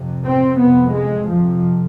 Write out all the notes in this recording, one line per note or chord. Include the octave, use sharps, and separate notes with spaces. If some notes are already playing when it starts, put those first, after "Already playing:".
Already playing: F2 C3
C4
F2 C3 B3
G#3
F2 C3 F3